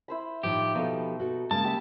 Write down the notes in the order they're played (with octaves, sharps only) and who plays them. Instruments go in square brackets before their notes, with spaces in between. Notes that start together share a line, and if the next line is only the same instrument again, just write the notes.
[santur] E4 C5 B5
[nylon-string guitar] A2 D#3 F3 [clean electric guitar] G4
[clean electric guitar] B2 [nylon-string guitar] F3 G4 A4 [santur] D#4
[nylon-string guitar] F#4 A4
[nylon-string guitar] C#3 G#3 A#3 [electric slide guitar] A5
[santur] G4 E5 B5